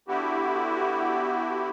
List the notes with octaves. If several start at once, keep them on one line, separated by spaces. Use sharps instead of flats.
D3 B3 E4 F#4 G4